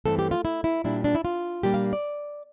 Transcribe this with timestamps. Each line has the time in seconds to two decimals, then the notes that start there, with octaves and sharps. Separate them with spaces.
0.06 G2 E3 A3 C4 A4
0.19 G4
0.31 F4
0.45 E4
0.64 E4
0.84 A#2 G3 D4 E4
1.04 D4
1.15 E4
1.25 F4
1.63 A#2 G3 A#3 D4 G4
1.74 F5
1.93 D5